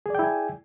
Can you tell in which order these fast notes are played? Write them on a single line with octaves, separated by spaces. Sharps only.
G#4 D5 G5 E4 G#5